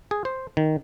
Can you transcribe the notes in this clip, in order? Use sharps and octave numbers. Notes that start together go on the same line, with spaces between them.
G#4
C5
D#3